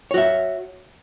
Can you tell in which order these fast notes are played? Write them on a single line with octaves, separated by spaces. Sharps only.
C#5 F#4 E5